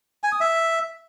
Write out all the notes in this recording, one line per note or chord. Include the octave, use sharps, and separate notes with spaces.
G#5
D#6
E5